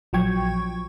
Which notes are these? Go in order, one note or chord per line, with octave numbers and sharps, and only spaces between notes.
A#1 F3 F#3 G5 C#6 G#6